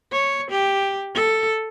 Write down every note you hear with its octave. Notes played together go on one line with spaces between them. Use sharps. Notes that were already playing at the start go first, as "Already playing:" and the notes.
C#5
G4
A4